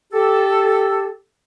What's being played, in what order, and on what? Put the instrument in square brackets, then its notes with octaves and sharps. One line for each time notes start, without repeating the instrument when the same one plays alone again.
[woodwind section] G4 A4